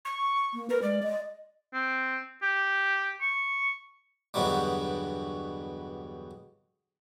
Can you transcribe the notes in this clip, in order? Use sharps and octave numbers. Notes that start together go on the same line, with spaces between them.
C#6
A#3
A#4 B4
G#3 D5
D#5
C4
G4
C#6
E2 G2 B2 D3 F#3 G3